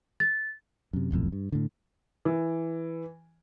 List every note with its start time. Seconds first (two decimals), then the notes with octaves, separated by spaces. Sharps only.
0.20 A6
0.93 F#2 C3
1.11 D#1 B1 F2 A2
1.32 G2
1.52 A2 D3
2.25 E3